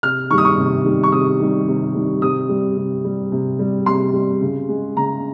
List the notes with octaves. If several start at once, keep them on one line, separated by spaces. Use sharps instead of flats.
C3 F6
D#3 G3 C#6
D#6
C#6
C3
D#3 G3
C#6
C3 D#6
D#3 G3
C3
D#3 G3
C3 D#6
G3
C3
G3
C3
G3
C3 C6
G3
C#3
G#3
C#3 A#5